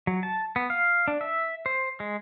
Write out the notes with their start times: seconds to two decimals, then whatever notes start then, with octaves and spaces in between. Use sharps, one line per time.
0.07 F#3
0.23 A5
0.56 B3
0.70 F5
1.08 D4
1.21 E5
1.66 C5
2.00 G#3